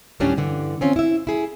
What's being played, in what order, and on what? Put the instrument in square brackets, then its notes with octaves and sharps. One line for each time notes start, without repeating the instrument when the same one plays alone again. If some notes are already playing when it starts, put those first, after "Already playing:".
[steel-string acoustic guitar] D2 A2 F#3 G3 C#4 D4
G2 D3 E3
C4 C#4 F4
E4 E5
E4 G#4